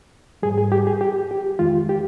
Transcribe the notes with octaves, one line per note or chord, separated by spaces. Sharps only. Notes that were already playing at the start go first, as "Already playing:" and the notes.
G#2 G3 G#4
G#4
G4
G#4
G4
G4
F2 D#3 G#3 F4
G4